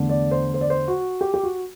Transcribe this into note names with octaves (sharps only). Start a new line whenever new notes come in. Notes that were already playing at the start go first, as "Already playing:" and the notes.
Already playing: E2 D3 A3
D5
C5
C5
D5
C5
F#4
G4
G4
F#4